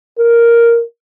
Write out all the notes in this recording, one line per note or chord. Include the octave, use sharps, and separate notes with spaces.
A#4